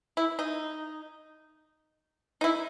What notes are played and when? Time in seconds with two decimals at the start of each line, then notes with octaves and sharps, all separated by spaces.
0.17 E4
0.39 D#4
2.41 D#4
2.44 E4